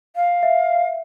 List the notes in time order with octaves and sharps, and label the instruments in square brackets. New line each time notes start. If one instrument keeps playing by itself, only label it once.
[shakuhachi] F5
[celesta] E5